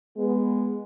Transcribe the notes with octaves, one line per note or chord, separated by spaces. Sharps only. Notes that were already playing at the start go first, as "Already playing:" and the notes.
G#3 B3